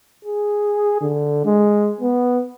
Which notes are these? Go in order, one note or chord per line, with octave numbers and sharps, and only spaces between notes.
G#4
D3
G#3
B3